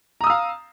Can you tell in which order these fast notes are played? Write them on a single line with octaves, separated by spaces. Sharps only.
A#5 D#6 E6 F5